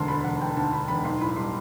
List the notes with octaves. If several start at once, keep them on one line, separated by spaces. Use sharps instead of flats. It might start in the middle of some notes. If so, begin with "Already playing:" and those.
Already playing: E1 D2 A5 C6
D3 B5
E1 F#5
E1 G5
D2 A5
D3 B5
E1 B5
B1 C6
A2 B5
G3 C6